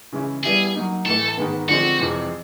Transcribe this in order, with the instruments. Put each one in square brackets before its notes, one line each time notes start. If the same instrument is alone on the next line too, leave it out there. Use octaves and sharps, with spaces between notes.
[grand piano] C#3 E3 G#3 C#4 E4
[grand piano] G3 B3 E4 G4 [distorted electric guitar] G#4
[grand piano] F#3 A#3 D#4
[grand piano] A2 E3 A3 [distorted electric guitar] A4
[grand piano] G#2 D#3 G#3 B3
[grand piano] D3 F3 G#3 C4 [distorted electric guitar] F#4
[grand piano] F2 C3 E3 G#3 C4